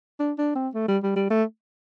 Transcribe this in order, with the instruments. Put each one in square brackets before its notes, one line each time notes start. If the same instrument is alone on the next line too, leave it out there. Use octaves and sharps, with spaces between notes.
[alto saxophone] D4
D4
C4
A3
G3
G3
G3
A3